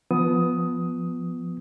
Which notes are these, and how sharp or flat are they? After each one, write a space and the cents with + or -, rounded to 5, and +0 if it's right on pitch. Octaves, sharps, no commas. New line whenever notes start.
F3 +0 B3 +0 D#6 +10